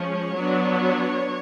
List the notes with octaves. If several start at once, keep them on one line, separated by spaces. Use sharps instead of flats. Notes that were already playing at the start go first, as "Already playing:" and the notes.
Already playing: F3 G#3 C#4 C#5
F#3 B3 D4